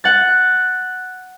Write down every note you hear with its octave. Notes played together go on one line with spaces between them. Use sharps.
F#5 A6